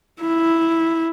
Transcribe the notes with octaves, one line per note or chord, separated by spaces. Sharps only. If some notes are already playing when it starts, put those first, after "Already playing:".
E4